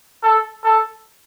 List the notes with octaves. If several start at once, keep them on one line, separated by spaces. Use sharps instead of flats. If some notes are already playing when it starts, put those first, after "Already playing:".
A4
A4